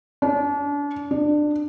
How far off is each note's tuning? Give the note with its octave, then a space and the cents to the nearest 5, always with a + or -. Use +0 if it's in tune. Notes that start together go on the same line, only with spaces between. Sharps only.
D4 -35
D4 +20